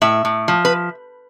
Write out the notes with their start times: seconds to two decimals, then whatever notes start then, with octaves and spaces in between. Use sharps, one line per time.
0.02 A2 E5
0.25 A2
0.48 F3
0.65 B4